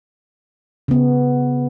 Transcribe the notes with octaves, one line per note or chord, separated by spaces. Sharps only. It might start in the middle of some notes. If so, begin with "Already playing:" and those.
C#3 B3